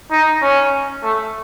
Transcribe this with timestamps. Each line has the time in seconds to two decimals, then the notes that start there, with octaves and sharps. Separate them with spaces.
0.11 D#4
0.42 C#4
1.03 A3